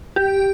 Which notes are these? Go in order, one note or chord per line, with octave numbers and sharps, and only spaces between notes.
G4